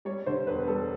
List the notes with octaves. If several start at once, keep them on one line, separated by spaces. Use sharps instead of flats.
G3 C#5
D3 C5
E1 B4
G3 A4